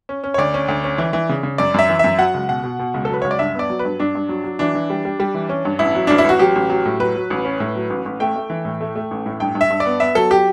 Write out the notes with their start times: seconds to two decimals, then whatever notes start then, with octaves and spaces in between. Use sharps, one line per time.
0.09 C#4
0.24 C#4
0.34 C#5
0.38 D2 D5
0.54 C#4
0.68 D2
0.84 C#4
0.98 E3
1.13 E3
1.29 C#3
1.43 C#3
1.58 F#2 D5
1.74 F#2 E5
1.89 E3
1.99 F#2 E5
2.18 F#3 F#5
2.34 C#2
2.49 B2 F#5
2.63 B2
2.79 B2
2.94 C#2
3.05 A4
3.09 F#3 B4
3.22 C#2 C#5
3.31 D5
3.39 G2 E5
3.55 B3 D5
3.70 F#3
3.79 B4
3.85 G2
4.00 G2 D4
4.15 G2
4.29 F#3
4.44 F#3
4.59 E3 D4
4.75 E3
4.90 G3
5.05 G3
5.20 G3
5.34 E3
5.49 C#4
5.65 G2
5.79 A1 E4
5.95 F#3
6.07 A1 D4
6.18 E4
6.24 A1 F#4
6.39 F#3 G4
6.55 A1
6.70 F#3
6.86 A2
7.00 F#3 B4
7.16 F#3
7.30 A1
7.45 C#4
7.60 A2
7.76 F#3
7.90 A1
8.06 A1
8.20 A3 G5
8.36 A3
8.50 E3
8.65 A2
8.81 A3
8.96 A3
9.11 A1
9.26 A2
9.40 G2 G5
9.55 G2
9.61 E5
9.70 G2
9.80 D5
9.86 B3
10.00 B3 E5
10.15 F#3 A4
10.31 G4